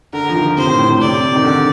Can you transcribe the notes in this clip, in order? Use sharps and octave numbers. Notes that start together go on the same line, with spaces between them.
D3 A#4
F3
D#3
C3 C5
A2
A2
A2
C3 D5
D#3
D3